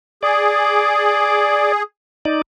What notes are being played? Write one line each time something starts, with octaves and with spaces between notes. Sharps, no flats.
G#4 D5
D#4 D5